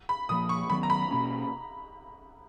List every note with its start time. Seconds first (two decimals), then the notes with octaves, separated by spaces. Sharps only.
0.09 B5
0.29 A#2 F3 A#3 D#6
0.49 C#6
0.70 D#3 F#3 B3 B5
0.83 A#5
0.90 B5
1.11 B2 A#3 C#4